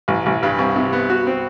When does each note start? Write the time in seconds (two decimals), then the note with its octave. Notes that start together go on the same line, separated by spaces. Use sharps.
0.08 A1
0.26 A1
0.43 G2
0.58 C2
0.76 C3
0.93 B3
1.10 F#4
1.27 C4